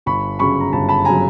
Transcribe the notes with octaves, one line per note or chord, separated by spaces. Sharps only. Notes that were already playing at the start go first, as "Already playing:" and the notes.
G1 B5 C#6
F#2 C#3 F#3 B5 C#6
A#5
G1 A5 B5
A5 B5
C#3 F#3 G#5 A#5